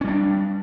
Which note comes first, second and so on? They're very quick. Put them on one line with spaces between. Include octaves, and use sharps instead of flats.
C#4 G3 D4